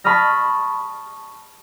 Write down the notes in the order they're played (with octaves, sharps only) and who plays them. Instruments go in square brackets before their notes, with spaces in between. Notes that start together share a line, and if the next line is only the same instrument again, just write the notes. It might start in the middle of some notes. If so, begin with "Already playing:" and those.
[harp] A5 B5 C#6 D#6 F6 A#6